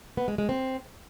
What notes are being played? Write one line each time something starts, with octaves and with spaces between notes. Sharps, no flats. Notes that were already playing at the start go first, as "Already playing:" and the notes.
B3
G#3
G#3
C4